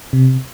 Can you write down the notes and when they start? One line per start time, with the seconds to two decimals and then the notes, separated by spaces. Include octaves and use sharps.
0.13 C3